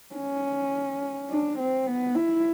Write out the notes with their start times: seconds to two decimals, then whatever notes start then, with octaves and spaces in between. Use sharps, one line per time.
0.15 C#4
1.30 D4
1.59 C4
1.87 B3
2.15 E4